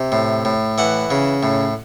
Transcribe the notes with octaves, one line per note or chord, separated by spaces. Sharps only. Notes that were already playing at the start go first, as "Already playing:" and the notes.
Already playing: C3
A2
A2
E3 F#5
C#3
A2